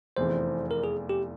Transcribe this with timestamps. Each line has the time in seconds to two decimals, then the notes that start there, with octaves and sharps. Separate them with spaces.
0.17 F1 E2 E3 C5
0.71 A#4
0.84 G#4
1.09 G4